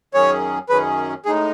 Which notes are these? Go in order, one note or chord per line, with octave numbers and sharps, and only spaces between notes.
F#2 D#3 F#3 C#4 G#4 C#5
F#2 D#3 F#3 C#4 G#4 B4
A2 G#3 D#4 G#4